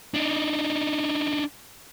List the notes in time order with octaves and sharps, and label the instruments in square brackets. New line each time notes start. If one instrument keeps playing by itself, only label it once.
[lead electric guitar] D4 D#4